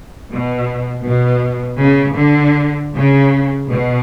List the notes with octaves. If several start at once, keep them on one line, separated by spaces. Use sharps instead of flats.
B2
B2
C#3
D3
C#3
B2